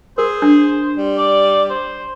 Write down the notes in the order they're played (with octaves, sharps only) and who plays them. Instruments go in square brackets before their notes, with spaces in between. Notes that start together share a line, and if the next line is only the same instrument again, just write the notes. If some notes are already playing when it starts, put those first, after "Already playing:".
[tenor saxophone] G#4 [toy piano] A#4 [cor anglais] C5
[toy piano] D4
[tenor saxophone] G3
[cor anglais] D5
C5